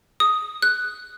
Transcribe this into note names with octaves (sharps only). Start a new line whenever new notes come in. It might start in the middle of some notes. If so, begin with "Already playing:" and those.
D#6
F#6